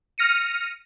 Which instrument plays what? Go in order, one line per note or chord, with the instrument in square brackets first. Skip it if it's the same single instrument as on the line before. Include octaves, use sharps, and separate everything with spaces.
[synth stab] F6 A#6 C#7 D#7